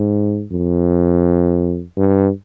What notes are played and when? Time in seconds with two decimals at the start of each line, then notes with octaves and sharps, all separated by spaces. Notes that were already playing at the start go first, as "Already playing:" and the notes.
Already playing: G#2
0.52 F2
1.97 G2